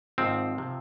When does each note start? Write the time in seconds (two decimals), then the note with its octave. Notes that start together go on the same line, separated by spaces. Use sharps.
0.18 G#1 G#2 F3 C4
0.58 C3 F3